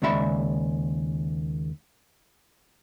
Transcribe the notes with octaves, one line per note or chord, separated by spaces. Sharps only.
D#2 C#3 G#3 D5 E5 B5